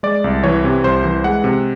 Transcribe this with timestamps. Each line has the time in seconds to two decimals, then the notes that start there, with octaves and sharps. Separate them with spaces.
0.03 G#3 D5
0.24 C2
0.44 E3 C#5
0.64 C3
0.84 C2 C5
1.04 E3
1.24 G#3 F#5
1.44 C3